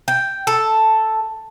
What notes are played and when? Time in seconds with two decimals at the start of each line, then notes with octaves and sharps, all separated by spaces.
0.08 G5
0.47 A4